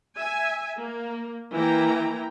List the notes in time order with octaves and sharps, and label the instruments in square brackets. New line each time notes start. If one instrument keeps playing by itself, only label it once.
[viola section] E5 G#5
A#3
E3 A#3 E4 G5 A#5